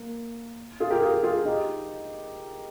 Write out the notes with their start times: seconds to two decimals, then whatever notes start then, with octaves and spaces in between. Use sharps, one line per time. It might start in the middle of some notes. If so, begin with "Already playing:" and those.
Already playing: A#3
0.80 F4 G#4
0.90 G4 A#4
1.02 F4 G#4
1.18 G4
1.24 F4 G#4
1.45 D#4 G4